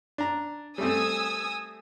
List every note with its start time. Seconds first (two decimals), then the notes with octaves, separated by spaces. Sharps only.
0.18 D4 A#5
0.78 G3 A3 C4 G#5 D#6 E6